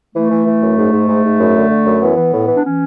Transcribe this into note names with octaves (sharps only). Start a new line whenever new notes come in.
E3 A3
E3
E3
F#2
G#2
G#2
G#2
G#2
F#2
D3
D3
F#2
E3 B3
E3
A2
E3
D4
E3 C#4